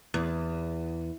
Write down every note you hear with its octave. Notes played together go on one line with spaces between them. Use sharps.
E2